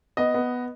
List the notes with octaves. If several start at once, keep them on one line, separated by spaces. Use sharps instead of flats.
B3 D#5
B3